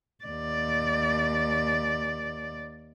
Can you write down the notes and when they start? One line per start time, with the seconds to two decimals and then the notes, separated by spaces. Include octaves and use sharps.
0.24 D#2 D5